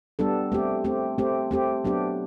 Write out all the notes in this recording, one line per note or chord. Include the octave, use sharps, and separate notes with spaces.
G3 B3 D4 A4
A3 C4 G4
A3 C4 G4
A3 C4 G4
A3 C4 G4
F#3 B3 D4 G4